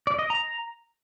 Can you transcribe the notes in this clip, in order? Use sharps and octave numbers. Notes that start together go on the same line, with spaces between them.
D5
D#5
A#5